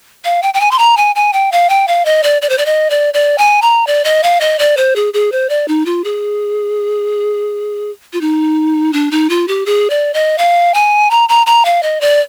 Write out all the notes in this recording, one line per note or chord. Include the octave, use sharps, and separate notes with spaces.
F5
G5
G5
G#5
C6
A#5
G#5
G#5
G5
F5
G5
F5
D#5
D5
D5
C5
D5
D#5
D5
D5
G#5
A#5
D5
D#5
F5
D#5
D5
C5
G#4
G#4
C5
D5
D#4
F4
G#4
F4
D#4
D4
D#4
F4
G4
G#4
D5
D#5
F5
G#5
A#5
A#5
A#5
F5
D#5
D5